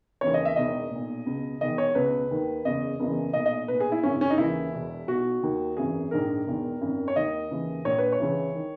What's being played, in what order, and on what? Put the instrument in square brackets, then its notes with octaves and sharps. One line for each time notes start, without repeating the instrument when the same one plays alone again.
[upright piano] D#2 C#3 E3 C#5
D#5
E5
E1 E2 D#3 D#5
A#2
B1
C#2 B2
E1 E2 D#3 D#5
C#5
C#2 B2 B4
D#2 D#3
F#1 E2 C#3 D#5
F#1 E2 C#3 E3
B1 A#2 D#5
D#5
B1 A#2 B4
G#4
E4
G#1 F#2 C#3 C#4
C#4
D#4
D#2 C#3 E3 E4
E1 E2 B2
B1 B2 F#4
D#2 D#3
G#1 F#2 E3 G#4
A#1 G#2 D#3 A#4
E1 E2 D#3
G#1 F#2 D#3
C#5
D#2 D#3 D#5
D#2 C#3 E3
A#1 A#2 C#5
B4
C#5
C#2 C#3 E3
D#3